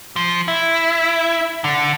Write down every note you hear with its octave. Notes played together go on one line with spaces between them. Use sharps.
F3
E4
D3